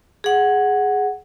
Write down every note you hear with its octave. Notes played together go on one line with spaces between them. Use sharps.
G#4 F#5